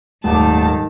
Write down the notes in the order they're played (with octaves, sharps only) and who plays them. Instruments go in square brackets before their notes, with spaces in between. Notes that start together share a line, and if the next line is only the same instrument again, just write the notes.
[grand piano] D#1 D6 [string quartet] G#2 D#3 [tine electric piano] A3 [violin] A5